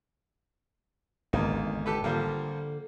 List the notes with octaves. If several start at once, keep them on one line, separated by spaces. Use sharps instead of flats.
G#1 E2 D3 A#3 D#4
G4 A4 B4
D3 F3 G3 A#3